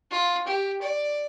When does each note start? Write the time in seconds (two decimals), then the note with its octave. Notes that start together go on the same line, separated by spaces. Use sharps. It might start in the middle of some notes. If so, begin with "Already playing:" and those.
0.11 F4
0.47 G4
0.81 D5